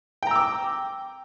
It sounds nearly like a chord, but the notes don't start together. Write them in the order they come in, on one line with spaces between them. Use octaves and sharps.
G5 A#5 E6 D6